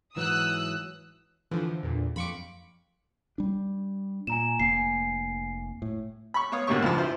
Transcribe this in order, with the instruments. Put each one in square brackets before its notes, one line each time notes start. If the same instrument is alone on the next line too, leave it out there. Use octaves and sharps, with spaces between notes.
[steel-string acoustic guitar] G#2 E3 F#3 [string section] D#6 E6 F#6
[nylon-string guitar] D3 [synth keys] E3 F3
[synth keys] E2 A#2
[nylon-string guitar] F2 [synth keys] B5 C#6 D6
[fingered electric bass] G3 D4
[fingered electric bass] A#2 [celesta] G#5 A#5 E7
[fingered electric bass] F1 A#3 [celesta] G#5 C7
[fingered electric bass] A2
[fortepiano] B5 C#6
B3 C#5 F5 D#6
G#2 B2 D3 A#3 G4 C#6
C#2 G2 F3
E4 F4 C5